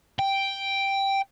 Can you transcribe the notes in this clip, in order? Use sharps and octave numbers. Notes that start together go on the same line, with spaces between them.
G5